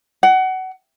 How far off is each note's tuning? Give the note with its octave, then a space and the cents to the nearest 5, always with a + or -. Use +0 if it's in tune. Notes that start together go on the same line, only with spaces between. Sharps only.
F#5 +25